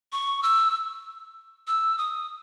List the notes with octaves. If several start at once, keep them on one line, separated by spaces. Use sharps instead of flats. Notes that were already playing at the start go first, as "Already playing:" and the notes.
C#6
E6
E6
D#6